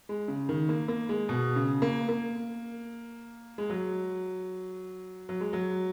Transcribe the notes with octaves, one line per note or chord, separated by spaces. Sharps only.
G#3
C#3
D#3
A#3
A#3
G#3
B2
C#3
A#3
A#3
G#3
F#3
F#3
G#3
F#3